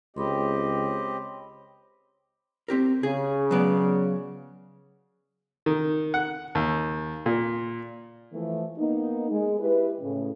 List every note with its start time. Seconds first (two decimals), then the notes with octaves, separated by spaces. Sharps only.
0.17 C#2 C4 G4 C#5 D#5 B5 C6
2.68 C4 G4 A#4
3.03 C#3 G#4
3.51 F#3 B3 D5
5.66 D#3
6.14 F#5
6.55 D#2
7.26 A#2
8.33 E3 F3 A3
8.78 A#3 B3 D#4
9.30 G#3
9.59 E4 G4 B4
10.01 A2 C#3